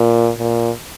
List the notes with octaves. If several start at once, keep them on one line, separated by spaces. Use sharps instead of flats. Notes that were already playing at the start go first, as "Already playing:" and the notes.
Already playing: A#2
A#2